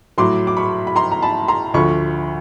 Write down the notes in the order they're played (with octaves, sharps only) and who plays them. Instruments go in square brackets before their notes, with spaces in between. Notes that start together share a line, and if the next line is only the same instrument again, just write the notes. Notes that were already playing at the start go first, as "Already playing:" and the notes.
[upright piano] A2 F#3 C6 D6
D6
B5 C#6
B5
A#5 C6
A#5
A5 B5
A#5 C6
D2 D3 F3 B5 C#6